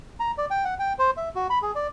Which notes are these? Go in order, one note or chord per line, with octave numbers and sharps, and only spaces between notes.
A#5
D5
G5
F#5
G5
C5
E5
F#4
B5
G#4
D5